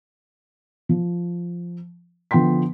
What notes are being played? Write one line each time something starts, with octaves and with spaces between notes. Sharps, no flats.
F3
D3 F3 B3 G5 C6 B6